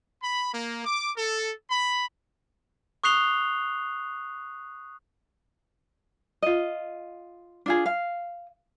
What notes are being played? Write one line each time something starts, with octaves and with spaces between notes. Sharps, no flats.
B5
A#3
D6
A4
B5
C#6 D#6 F#6 C7 F7 G7
F4 D#5
D4 F4 G#4
F5